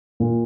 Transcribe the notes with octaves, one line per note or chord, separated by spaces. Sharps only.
A#2